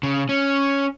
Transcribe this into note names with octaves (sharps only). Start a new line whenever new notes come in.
C#3
C#4